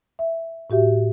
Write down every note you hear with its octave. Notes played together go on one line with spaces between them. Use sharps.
E5
A2 F#4 G4 E5